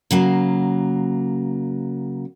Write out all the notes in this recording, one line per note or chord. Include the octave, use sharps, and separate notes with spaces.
C#3 F#3 A#3